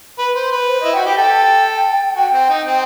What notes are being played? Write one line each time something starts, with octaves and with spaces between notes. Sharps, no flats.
B4
C5
B4
C5
E4 D#5
F#4 G5
G4 G5
A4 G5
F#4 G5
C4
D#4
C4